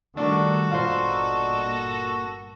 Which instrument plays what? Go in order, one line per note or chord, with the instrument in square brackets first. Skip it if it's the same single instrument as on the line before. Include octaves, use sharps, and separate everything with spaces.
[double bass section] D#3 G3 [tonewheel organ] A3 [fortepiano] D4 [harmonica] F#4 A4
[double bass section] G1 G2 A#2 [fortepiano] F4 C5 [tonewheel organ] D5 D#5 A#5
[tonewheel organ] A#3 A#6